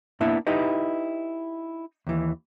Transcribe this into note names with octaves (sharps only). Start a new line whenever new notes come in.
A#3 B3 D4 E4 E5
D#4 E4 G4 B4 D#5
D#2 E3